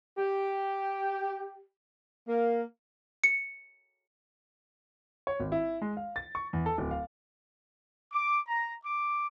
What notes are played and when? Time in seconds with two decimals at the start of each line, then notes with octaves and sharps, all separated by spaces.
0.18 G4
2.28 A#3
3.24 C#7
5.27 C#5
5.40 G#1
5.52 E4
5.82 G#3
5.97 F5
6.16 A6
6.35 C#6
6.53 E2
6.66 A4
6.78 D1
6.91 F5
8.13 D6
8.48 A#5
8.85 D6